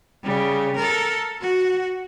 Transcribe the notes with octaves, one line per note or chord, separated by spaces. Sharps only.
C#3 G3
A4 A#4
F#4